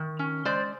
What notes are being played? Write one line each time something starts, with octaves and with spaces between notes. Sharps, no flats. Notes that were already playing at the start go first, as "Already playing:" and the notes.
Already playing: D#3
C#4
G#3 C5 D5